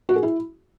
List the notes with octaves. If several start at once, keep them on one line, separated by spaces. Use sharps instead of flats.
F#4
G#4
E4